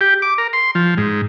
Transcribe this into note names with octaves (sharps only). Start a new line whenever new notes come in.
G4
D6
A#4
C6
F3
G#2